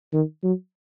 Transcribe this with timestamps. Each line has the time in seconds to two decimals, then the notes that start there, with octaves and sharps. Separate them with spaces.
0.13 D#3
0.43 F#3